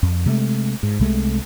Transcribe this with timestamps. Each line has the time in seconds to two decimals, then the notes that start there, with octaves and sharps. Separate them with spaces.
0.03 F2
0.26 C3 G#3 A3
0.83 G#2
0.99 C2 C3 G#3 A3